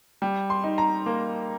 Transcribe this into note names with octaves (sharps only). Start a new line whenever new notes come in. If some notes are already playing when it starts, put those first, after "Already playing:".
G3
C6
D#4
A#5
A#3